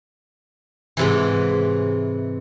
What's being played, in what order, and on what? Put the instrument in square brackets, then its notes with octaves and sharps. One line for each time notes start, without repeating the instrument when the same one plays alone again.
[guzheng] G#2 C3 E3